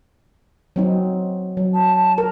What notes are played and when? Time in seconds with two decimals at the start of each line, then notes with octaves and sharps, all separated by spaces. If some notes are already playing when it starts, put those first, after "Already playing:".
0.76 F#3 C4 D#4
1.57 F#3
1.74 A5
2.18 A#4